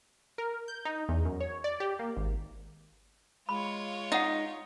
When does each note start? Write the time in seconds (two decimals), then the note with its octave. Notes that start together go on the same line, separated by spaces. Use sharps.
0.38 A#4
0.68 G6
0.85 D#4
1.09 E2
1.25 F#2
1.40 C#5
1.64 D5
1.80 G4
1.99 A#3
2.17 G#1
3.49 G#3 F4 C#5 B5
4.12 D#4 D#5 F#5